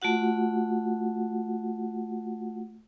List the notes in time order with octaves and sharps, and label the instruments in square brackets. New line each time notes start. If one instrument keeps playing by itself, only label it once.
[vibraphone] A3 F4 F#4 F#5